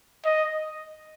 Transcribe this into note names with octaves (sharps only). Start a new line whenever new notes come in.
D#5